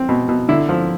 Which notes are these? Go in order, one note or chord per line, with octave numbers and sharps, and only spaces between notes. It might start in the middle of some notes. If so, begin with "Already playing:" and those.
Already playing: C4
B2
B2
D3 E4
F3